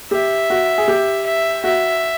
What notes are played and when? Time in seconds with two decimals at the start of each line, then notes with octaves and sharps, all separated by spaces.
0.11 G4 E5
0.50 F#4
0.78 G#4
0.88 G4
1.26 E5
1.64 F#4 E5